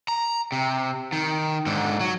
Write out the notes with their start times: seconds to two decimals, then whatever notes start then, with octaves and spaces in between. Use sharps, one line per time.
0.08 A#5
0.52 C3
1.12 D#3
1.66 G#2 D3
2.00 F#3